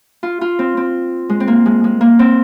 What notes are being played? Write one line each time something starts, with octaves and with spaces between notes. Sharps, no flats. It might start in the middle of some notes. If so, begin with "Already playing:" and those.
F4
F4
C4
C4
G#3
C4
A#3
G#3
G#3
A#3
C4